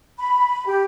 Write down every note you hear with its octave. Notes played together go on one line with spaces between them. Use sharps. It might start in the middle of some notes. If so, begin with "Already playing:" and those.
B5
G4